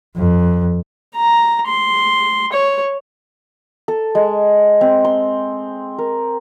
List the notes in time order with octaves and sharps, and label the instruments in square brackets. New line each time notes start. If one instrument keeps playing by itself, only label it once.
[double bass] F2
[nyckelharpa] A#5
C6
C#5
[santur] A4
G#3
C4
C6
A#4